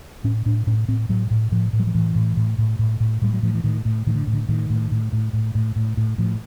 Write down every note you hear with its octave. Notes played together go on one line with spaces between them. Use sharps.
A2 C#4
A2 D4
A2 C#4
A2 C4
A2 F#3
A2
A2 F3
A2
F#3
F3
A2 E3
A2
A2
A2
A2
A2
A2 G3
F#3
A2 F3
E3
A2 D#3
A2
A2 D#3
D3
A2
D3
A2 D#3
A2
A2
A2
A2
A2
A2
A2
A2 F3